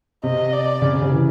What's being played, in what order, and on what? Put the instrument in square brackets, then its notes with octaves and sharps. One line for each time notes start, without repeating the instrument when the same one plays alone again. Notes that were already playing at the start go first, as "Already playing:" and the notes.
[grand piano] C3 [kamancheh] D#5
[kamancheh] D5
[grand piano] C#3
C3
C#3
E3